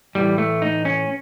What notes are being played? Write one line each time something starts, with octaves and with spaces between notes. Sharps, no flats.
A2 E3 G3
A3
D#4
C#4